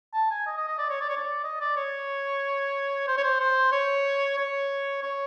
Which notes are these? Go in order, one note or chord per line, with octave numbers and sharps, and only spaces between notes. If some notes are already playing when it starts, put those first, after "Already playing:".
A5
G#5
D#5
D#5
D#5
D5
C#5
D5
C#5
D5
D#5
D5
C#5
C5
C#5
C5
C5
C#5
C#5
C#5